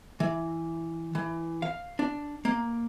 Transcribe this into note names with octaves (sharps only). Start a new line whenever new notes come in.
E3
E3
F5
D4
A#3